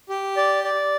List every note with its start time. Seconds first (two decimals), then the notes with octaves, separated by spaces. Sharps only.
0.09 G4
0.37 D5
0.64 D5